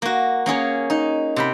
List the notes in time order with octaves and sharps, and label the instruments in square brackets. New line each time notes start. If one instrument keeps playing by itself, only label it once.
[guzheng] A#3 F#4
A#3 C#4 G#4 C#5
D#4
C3 G5 B5